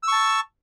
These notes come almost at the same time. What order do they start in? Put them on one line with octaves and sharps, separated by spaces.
E6 C#6 A5